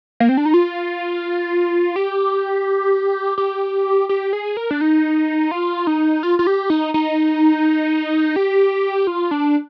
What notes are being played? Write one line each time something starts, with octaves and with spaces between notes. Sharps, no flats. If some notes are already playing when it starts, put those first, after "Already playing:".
A#3
C4
D4
D#4
F4
G4
G4
G4
G#4
A#4
D4
D#4
F4
D#4
F4
F4
G4
D#4
D#4
G4
F4
D4